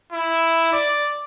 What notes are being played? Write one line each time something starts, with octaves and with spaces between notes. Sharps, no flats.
E4
D5